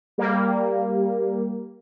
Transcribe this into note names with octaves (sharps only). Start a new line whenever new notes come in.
G3 A#3